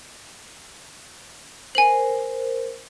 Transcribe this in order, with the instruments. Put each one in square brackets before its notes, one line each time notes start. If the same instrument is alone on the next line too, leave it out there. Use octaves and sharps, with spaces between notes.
[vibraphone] A#4 C5 [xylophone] G#5 F#7